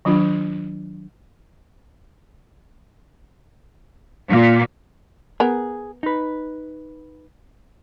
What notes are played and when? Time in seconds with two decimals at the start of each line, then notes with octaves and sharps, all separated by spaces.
0.05 D#3 F#3 D4 F4
4.29 A#2
5.40 B3 G#4 A#4
6.03 D#4 B4